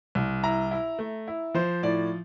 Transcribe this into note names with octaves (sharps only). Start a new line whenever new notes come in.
C2
E4 A#5
E4
A3
E4
F3 C5
A2 D5